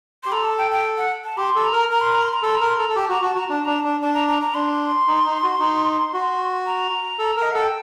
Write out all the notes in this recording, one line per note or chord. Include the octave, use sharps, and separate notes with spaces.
G4 C6
A4 A#5
A5
G5
G5
F#5
A5
G4 C6
A4
A#5
A#4
A#4 A#5
C6
A#5
C6
A#5
A4 C6
A#5
A#4 C6
A4 A#5
A4
G4 A5
F#4 A#5
F#4 A5
F#4 A#5
D4 A5
D4 A#5
D4 A5
D4 A5
A#5
A#5
A#5
D4 C6
D#4
D#4
F#4
D#4
F#4
A#5
A4
A#4
D#5
A4 F#5
G5